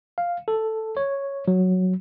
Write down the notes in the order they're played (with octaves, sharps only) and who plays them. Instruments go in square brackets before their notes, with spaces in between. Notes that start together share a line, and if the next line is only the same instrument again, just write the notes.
[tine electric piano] F5
A4
C#5
F#3